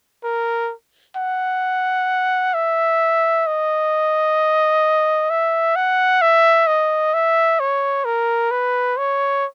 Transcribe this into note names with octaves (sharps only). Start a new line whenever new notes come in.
A#4
F#5
E5
D#5
E5
F#5
E5
D#5
E5
C#5
A#4
B4
C#5